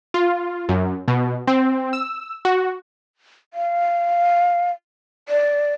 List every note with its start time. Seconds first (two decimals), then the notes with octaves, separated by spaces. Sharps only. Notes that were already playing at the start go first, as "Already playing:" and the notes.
0.14 F4
0.69 F#2
1.08 B2
1.48 C4
1.93 E6
2.45 F#4
3.54 F5
5.29 D5